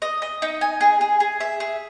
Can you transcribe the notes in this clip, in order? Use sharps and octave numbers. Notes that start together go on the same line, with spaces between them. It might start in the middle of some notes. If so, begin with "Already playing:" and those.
D#5
D#5
D#4
G#5
G#4
G#4
G#4
E5
G#4